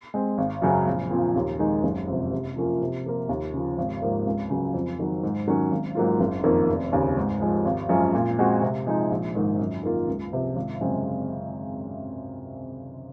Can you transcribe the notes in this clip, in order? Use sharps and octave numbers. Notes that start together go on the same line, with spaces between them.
G#3 C4
G#1
F#2 C#3 F#3 C#4
A#1
A#2 F3 C4
D#2
D#3 G#3 D#4
F#1
F2 C3
C3
F3 A#3 C#4 F4
C3
F3 A#3 F4 A#4
D#2
C#3 F3
G#1
G#2 F3 A#3
C#2
C#3 F#3
F2
D#3 F#3
G#2
D#3 F#3 C#4
G#1
G#2 F#3 A#3 F4
F#1
F2 D#3 A#3
F1
D#2 C#3
G#2
F3 G#3
G#1
F#2 F3 G#3 C#4
A#2
G#3 C4 F#4
C3
F3 G#3 D#4
A#1
G#2 D#3
F#2
D#3 A#3 F4
C#2
C3 F3
G#1
F#2 C#3 G#3 C4